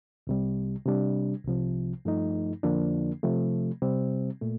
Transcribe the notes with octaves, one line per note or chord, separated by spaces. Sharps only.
C2 C3 G3
C3 G3 D4
C2 C3 F3
G2 F3 A3 D#4
F2 D3 F3 A#3 D4
C3 F3 A3
C3 G3 C4
A#2 A3